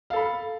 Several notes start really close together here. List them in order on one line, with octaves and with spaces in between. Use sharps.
F5 A4 B5